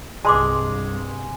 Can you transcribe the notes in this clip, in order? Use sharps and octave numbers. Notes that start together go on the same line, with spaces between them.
C2 G2 G#3 A5 C6 D6